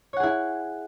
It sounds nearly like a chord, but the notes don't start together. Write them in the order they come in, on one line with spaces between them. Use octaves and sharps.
C#5 F#5 G#4 E4 G#5